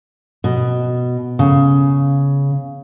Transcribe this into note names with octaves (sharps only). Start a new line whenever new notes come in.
B2
C#3